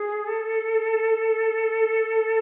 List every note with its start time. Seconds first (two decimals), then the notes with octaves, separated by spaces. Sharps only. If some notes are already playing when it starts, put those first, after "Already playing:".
Already playing: G#4
0.27 A4